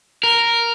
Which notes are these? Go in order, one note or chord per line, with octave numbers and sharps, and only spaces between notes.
A#4